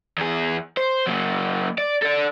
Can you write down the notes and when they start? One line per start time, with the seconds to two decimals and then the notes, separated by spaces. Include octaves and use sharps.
0.18 E2 G#4
0.77 C5
1.07 F#3 A#3
1.78 D5
2.02 A4 D5